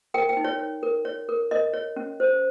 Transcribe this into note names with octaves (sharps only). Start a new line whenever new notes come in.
A#4 G5
G5
D#4
C#5
C#5
A#4
C#5
A#4
A#4 D#5
C#5
C#4
C5